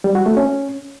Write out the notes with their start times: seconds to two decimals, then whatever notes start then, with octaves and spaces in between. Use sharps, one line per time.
0.04 G3
0.15 F#4
0.26 A3
0.37 C#4